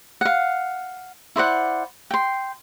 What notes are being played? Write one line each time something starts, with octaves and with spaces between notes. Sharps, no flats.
F5 F#5
E4 C5 D5 F#5
G5 C6